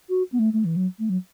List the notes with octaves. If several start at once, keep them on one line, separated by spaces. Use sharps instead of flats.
F#4
B3
A3
A3
E3
F#3
A3
F#3